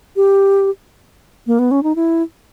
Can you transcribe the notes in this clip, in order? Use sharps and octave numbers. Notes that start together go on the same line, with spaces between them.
G4
A#3
B3
C#4
D#4
E4